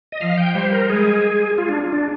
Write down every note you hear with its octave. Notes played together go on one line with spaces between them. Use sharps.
D#5
F3 F5
G5
G3 C5
A#4
G#3 G#4
F4
D4
D4